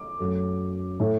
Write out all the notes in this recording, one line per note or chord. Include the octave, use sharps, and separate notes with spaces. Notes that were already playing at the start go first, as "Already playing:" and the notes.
Already playing: D6
F#2 F#3 A3
A2 A3